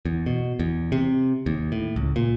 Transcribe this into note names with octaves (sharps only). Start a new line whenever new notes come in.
E2
B2
E2
C3
D#2
A2
C#2
A#2